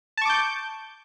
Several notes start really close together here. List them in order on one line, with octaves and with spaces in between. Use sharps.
A5 C#6 D6 G6